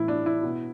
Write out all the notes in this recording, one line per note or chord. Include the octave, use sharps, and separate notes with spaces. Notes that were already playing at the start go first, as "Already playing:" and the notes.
Already playing: A2 E3 E4
D4
E4
B2